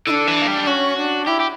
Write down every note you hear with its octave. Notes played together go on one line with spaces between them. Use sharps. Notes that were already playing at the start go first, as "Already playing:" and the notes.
D3 D4 E4
E3
A#3
G3
C#4 F#4
D4
E4 G4
G4